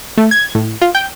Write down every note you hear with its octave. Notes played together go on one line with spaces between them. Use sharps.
A3
G#6
A2
F4
G5